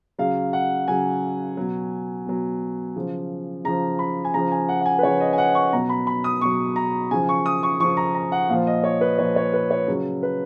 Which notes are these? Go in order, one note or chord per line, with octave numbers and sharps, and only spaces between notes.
C#3 F#3 F5
F#5
C#3 F#3 G#5
B2 F#3
B2 F#3
C#3 F3
C#3 F3 A#5
B5
G#5
C#3 F3 A#5
G#5
F#5
F#5
G#5
B4
C#3 F3 C#5
D#5
G#5
F#5
C#6
B2 F#3 A#5
B5
B5
D#6
B2 F#3 C#6
A#5
C#3 F3 G#5
C#6
D#6
C#6
C#3 F3 C#6
A#5
A#5
F#5
A#2 F3 F5
D#5
C#5
B4
A#2 F3 C#5
C#5
B4
C#5
C#3 F#3
B4